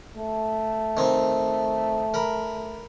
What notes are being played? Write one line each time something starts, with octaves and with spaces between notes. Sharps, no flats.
A3
D#3 C4
A#4 B5